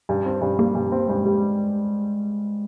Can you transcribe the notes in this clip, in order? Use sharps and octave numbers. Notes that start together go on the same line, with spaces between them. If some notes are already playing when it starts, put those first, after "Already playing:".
G2
C4
G2
G3 A#3
G2
C4
G2 G#3
G3